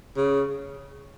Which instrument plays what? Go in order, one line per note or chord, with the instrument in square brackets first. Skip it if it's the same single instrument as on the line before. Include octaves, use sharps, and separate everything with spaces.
[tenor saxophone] C#3